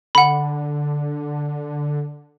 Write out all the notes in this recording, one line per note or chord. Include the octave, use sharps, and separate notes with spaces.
D3 F#5 B5